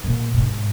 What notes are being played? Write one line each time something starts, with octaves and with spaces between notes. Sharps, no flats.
A#2
A#2
G#2